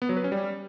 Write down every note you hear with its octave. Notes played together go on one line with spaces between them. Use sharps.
B3
F#3
B4
C#4
G3